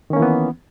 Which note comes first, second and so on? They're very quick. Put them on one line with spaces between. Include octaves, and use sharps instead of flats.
D#3 C#4 A#3 E3 B3